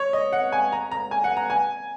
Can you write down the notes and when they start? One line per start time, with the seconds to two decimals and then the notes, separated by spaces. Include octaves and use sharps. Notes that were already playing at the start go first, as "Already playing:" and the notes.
Already playing: C#5
0.13 D#5
0.33 F#5
0.52 G#5
0.72 A#5
0.91 A#5
1.11 G#5
1.24 F#5
1.37 A#5
1.50 G#5